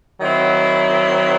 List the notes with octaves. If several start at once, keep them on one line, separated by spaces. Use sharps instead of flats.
D#3 F#3 C4 E4